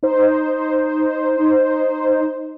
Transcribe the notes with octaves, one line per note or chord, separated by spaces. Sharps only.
D#4 C5